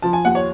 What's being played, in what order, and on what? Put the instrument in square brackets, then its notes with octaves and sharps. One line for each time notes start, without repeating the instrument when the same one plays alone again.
[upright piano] F3 A5
G#5
D#2 F#5
C#5